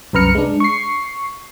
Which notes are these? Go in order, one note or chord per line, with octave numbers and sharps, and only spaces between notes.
C2 F#2 B4 A#5 F6 C#7
G#3 D4
C#6 C7